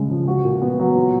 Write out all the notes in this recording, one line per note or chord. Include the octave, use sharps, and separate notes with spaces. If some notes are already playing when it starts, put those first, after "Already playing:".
Already playing: C#3 G#3
F3
F#4
A#2
B3
F#3
F4